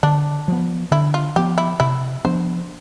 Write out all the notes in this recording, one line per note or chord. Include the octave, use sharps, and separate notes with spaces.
D3 D4
F3 B3
D3 E4
F4
F3 B3 G4
E4
C3 E4
F3 B3 D4 C5